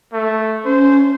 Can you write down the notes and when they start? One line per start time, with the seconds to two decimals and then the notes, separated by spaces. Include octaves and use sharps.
0.13 A3
0.65 C#4 C5